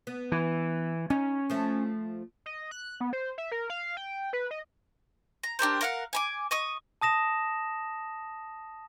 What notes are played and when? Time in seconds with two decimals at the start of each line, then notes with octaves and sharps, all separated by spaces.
0.07 B3
0.32 E3
1.10 C#4 D#4
1.50 F3 A3
2.46 D#5
2.71 F#6
3.01 B3
3.13 C5
3.38 E5
3.52 A#4
3.70 F5
3.97 G5
4.33 B4
4.51 D#5
5.43 A#5
5.59 D4 G4 A#4 C5
5.81 A#4 F5 F#5
6.13 G#5 B5 D6
6.51 D#5 C#6 D#6
7.01 A5 D#6 A#6 E7